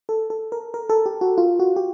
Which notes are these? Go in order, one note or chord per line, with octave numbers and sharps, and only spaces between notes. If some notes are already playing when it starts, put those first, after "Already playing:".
A4
A4
A#4
A#4
A4
G4
F#4
F4
F#4
G4